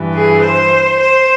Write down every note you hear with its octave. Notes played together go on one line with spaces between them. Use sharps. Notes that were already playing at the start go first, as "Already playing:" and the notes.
Already playing: G2 E3
G#4
C5
C5